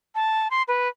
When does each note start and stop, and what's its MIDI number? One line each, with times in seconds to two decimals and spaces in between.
0.15 0.48 81
0.51 0.62 84
0.68 0.88 71